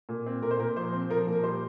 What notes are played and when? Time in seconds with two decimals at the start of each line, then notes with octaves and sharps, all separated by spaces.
0.09 A#2
0.26 C4
0.42 A#2 A#4
0.51 C5
0.60 A#2 A#4
0.76 F3 C5
0.93 C4
1.10 F3 A#4
1.21 A#4
1.27 A#2
1.32 A#4
1.43 G3 C5